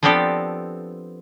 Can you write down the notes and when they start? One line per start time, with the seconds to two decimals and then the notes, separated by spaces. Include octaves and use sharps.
0.03 F3 B3 C4 D4 G4 A4